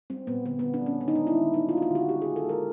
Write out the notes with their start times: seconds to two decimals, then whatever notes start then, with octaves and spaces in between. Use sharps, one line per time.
0.10 G3 C4
0.27 A#2 B3
0.46 D3 B3
0.59 B3
0.64 D3
0.74 D4
0.82 G3 C#4
1.01 D#3 D4
1.08 D#4
1.15 D4
1.19 G#3
1.27 E4
1.37 D#3
1.54 G3 D#4
1.69 F4
1.73 A#3 F#4
1.82 F4
1.90 D3 F#4
2.09 G#3 G4
2.22 G#4
2.26 D#3
2.36 A4
2.45 G#3 A#4